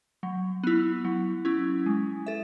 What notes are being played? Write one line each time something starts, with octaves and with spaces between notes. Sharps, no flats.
F#3
B3 E4
F#3
C#4 E4
G#3
A4 E5